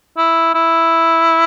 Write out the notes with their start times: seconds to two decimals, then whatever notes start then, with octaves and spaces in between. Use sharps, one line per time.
0.17 E4
0.54 E4